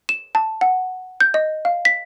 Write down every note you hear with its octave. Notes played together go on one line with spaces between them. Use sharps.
E7
A5
F#5
G6
D#5
F5
B6